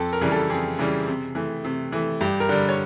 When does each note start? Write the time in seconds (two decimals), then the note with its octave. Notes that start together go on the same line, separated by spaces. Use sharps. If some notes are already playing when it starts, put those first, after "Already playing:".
Already playing: F2 A4
0.13 A#4
0.21 C#3 E3 G3
0.32 A4
0.50 F2 G#4
0.79 C#3 E3 G3
1.07 C3
1.35 E3 A3
1.64 C3
1.92 E3 A3
2.21 G2 G4
2.40 A#4
2.49 D3 G3
2.69 C#5